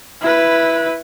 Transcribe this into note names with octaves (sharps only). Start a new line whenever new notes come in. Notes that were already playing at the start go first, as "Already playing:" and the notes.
E4 B4